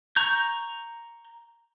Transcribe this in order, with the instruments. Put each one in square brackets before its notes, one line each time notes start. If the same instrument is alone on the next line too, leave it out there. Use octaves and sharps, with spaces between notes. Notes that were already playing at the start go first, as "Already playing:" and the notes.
[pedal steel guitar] A#5 C#6 G6